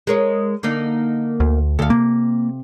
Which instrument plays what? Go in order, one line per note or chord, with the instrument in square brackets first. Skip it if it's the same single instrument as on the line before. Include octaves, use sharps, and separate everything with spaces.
[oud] G#3 A#4 C#5
D3 A#3 D#4
[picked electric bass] D2
[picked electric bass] D2 [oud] A4 F5
[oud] C3 [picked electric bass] A#3